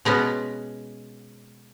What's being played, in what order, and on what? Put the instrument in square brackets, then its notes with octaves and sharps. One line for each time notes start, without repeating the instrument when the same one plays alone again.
[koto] B2 G#3 B3 C#4